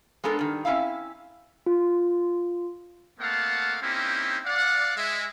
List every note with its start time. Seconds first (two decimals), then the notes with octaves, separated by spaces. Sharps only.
0.24 G#3 B3 D4 A4 A#4
0.39 G2 D#3
0.65 C4 C#4 E4 E5 F5
1.66 F4
3.20 A3 A#3 C4 F5 F#5 A5
3.82 A#3 C4 C#4 D#4 E4 G4
4.45 D5 F5 F#5
4.96 G#3 E5